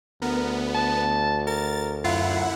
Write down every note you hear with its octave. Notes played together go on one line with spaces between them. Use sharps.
D2 B3 A#4
A5
A#4 A6
F#2 E4 F4 F#5